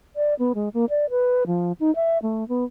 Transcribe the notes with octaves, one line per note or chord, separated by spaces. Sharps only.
D5
B3
G#3
A#3
D5
B4
F3
D#4
E5
A3
B3